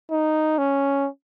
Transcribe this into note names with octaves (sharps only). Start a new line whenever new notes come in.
D#4
C#4